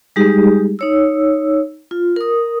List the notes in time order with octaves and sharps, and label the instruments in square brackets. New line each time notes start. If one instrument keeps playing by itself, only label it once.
[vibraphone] G3 G#3 D#4 G4 G#4
D#4 C#5 E6
F4
A#4 D#6